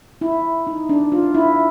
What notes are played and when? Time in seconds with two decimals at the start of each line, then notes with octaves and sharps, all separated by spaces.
0.21 E4
0.67 D#4
0.89 D4
1.12 F4
1.35 E4